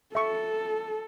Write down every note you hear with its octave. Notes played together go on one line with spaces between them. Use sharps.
A4 E5 C#6